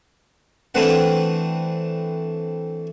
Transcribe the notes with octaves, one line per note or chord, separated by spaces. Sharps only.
E3 A3 C4 D4 B4 F#5